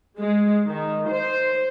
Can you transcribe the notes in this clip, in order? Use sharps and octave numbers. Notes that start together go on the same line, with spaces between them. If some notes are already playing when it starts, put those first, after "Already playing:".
G#3
D#3
C5